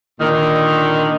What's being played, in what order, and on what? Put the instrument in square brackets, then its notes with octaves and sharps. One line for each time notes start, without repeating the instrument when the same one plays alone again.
[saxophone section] A#2 D3 D#3